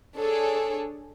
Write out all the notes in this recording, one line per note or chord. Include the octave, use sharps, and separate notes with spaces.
D4 G#4 A4 C#5